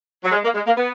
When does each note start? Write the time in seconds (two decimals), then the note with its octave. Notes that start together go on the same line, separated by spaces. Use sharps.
0.23 F#3
0.31 G#3
0.43 A#3
0.54 G#3
0.66 A#3
0.77 B3